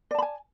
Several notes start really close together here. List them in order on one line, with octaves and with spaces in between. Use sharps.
D5 A5 B5 G#5